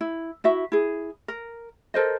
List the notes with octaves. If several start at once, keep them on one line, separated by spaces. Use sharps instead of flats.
E4
E4 F#4 E5
E4 G#4
A#4
A4 A#4 C5 D#5